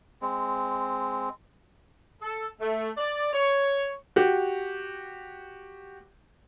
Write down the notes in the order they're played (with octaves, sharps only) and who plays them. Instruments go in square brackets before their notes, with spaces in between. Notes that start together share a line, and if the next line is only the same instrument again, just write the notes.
[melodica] G#3 C4
[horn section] A4
A3
D5
C#5
[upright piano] F#4 G4